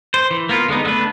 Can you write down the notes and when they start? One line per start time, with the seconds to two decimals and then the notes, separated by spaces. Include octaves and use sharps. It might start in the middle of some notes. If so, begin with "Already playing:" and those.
0.14 C5
0.31 E3
0.49 A#3 B3 F4
0.68 D3 G#3 B3 D#4
0.85 A3 B3 D4 B4